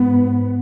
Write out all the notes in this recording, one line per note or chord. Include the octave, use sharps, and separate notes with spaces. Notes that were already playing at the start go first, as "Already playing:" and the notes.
Already playing: G#2 B3